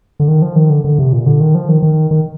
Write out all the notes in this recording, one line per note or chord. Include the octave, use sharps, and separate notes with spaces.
D3
D#3
F3
D#3
D3
D3
C3
A#2
D3
D#3
F3
D#3
D#3
D#3